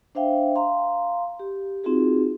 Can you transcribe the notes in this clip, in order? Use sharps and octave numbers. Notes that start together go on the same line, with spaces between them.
D4 C5 E5 F5 G5
F5 A#5 C6
G4
C4 D#4 F4 F#4 G#4